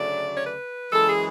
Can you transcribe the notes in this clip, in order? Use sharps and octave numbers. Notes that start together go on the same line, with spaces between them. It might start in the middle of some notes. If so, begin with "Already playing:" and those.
Already playing: D2 C#3 F#3 A3 D5
C#5
B4
F#2 E3 G#3 A4
G#4